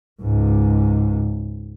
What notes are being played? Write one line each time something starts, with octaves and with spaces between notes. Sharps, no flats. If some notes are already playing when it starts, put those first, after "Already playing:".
C#2 G#2